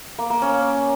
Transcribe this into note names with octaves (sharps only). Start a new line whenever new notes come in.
A#3
A#3
C#4